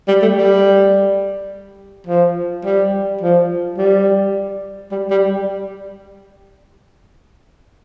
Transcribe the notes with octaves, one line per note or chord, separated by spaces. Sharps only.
G3
A3
G3
F3
G3
F3
G3
G3
G3